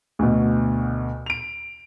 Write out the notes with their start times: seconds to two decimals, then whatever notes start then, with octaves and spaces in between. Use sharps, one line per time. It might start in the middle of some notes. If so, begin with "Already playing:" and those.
0.19 D2 B2
1.26 D7 F7